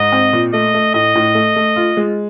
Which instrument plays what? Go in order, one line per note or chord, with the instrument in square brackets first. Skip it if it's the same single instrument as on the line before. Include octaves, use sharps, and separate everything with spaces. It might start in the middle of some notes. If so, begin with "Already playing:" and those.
Already playing: [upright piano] G#2 [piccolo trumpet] D#5
[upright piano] C4
A#2
[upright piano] A3 [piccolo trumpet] D#5
[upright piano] A3
[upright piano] A2 [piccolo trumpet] D#5
[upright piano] A2
A3
A3
F4
G#3